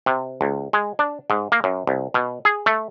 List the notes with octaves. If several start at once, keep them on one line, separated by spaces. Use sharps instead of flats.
C3
C#2
G#3
D4
G#2
A#3
F#2
C2
B2
G#4
A3